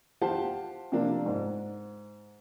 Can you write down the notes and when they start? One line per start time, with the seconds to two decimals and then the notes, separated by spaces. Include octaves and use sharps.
0.21 F4 G4 C5 F#5 A5
0.92 C3 F3 A#3 D4
1.26 G#2